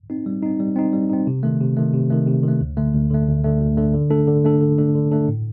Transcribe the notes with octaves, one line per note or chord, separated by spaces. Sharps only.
C4 D#4
G3
C4 D#4
G3
C4 D#4
G3
C4 D#4
C3
D#3 A3
C3
D#3 A3
C3
D#3 A3
C3
D#3 A3
D2
D3 A3
D2
D3 A3
D2
D3 A3
D2
D3 A3
D3
A3 D4 A4
D3
A3 D4 A4
D3
A3 D4 A4
D3
A3 D4 A4
A2